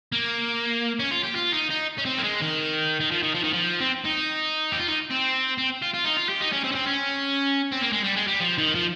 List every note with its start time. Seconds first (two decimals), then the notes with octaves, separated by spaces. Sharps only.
0.12 A#3
0.99 C#4
1.11 F4
1.24 G4
1.35 F4
1.52 D#4
1.70 D#4
1.98 C#4
2.05 C4
2.18 A#3
2.24 G#3
2.41 D#3
3.01 D#3
3.11 F3
3.23 D#3
3.35 F3
3.44 D#3
3.53 F3
3.81 C4
4.05 D#4
4.72 G4
4.79 F4
4.88 D#4
5.11 C4
5.58 C4
5.82 F4
5.94 F4
6.05 D#4
6.17 F4
6.29 G4
6.41 D#4
6.52 C#4
6.64 C4
6.71 C#4
6.75 C4
6.87 C#4
7.72 C4
7.82 A#3
7.93 G#3
8.04 G3
8.16 G#3
8.27 G3
8.40 F3
8.58 D#3
8.75 F3